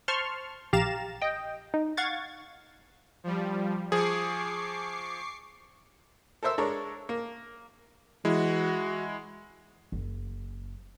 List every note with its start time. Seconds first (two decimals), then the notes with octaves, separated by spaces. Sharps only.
0.08 C5 A5 C6 C#6 F6
0.73 A#1 G4 F5 A#5 A6 E7
1.22 D#5 G5
1.74 D#4
1.97 F5 F#5 C#6 G#6 A6
3.24 F3 G3
3.92 F3 G#4 C#6 D6 C7
6.43 A4 A#4 C5 E5 E6
6.58 G#3 D4 A4 A#4 C#5
7.09 A#3
8.25 E3 G#3 E4 F#4
9.92 F#1